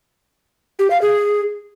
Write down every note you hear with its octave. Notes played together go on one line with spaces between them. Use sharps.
G4
F5
G#4